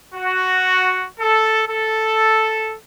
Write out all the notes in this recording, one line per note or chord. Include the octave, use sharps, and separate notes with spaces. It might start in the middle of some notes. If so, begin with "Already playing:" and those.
F#4
A4
A4